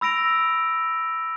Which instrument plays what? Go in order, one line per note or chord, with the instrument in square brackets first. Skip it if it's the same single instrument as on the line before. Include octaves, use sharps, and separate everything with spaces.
[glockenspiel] B5 E6 A#6 D7 F7